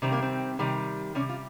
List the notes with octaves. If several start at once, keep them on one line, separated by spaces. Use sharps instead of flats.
C3 D#3 G3 C4
A#3
C4
C3 D#3 G3
C3 G3 C#4
F4